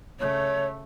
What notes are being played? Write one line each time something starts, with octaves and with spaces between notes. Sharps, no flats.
C#3 A3 C#5